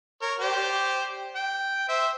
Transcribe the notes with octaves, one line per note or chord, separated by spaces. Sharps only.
A#4 C#5
G4 C5 D5
G5
C5 E5